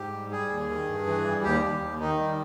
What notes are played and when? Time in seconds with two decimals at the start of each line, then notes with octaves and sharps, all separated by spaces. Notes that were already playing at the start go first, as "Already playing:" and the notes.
Already playing: G#2 G4
0.12 G3
0.31 G3 G#4
0.49 D#2
0.69 D#3
0.88 G2
1.06 E3
1.25 G3
1.44 D#2 G4
1.62 D#2
1.82 D#2
2.00 D#3 D#4
2.18 G3